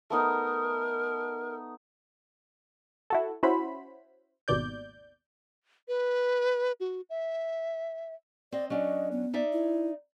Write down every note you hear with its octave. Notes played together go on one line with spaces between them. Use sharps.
A3 B3 D#4 A#4
E4 F#4 A4
C#4 E4 F#4 C5 B5
G#1 D#2 B2 D5 G6
B4
F#4
E5
C4 D5 D#5
F#3 C#4 D4 D#5
B3
D#4 D5 E5
E4